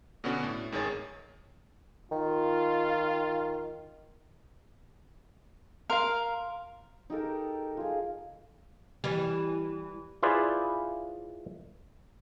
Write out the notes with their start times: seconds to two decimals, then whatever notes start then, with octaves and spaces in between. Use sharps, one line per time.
0.24 B2 D3 B3 C#4 D4 F#4
0.43 A2
0.72 G#1 D#3 G#4 C#5 A6
2.11 D#3 F4
5.90 A#4 F5 C6
7.10 D#4 G4 A4 A#4
7.77 F4 G#4
9.04 E3 G3
10.23 E4 F4 G#4 B4 C5 D5